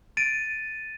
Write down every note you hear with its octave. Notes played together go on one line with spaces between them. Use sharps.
A6 D7 D#7